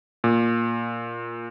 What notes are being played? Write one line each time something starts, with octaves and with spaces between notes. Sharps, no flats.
A#2